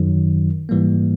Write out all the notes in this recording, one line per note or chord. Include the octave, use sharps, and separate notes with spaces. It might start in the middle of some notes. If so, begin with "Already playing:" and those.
Already playing: F#2 D#3 F#3
G#2 E3 G3 A#3